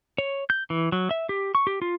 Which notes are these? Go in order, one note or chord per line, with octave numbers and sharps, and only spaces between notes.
C#5
G6
E3
F#3
E5
G4
C#6
G4
F4